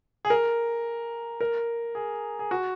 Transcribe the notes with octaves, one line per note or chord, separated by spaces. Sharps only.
G#4
A#4
A#4
G#4
G#4
F#4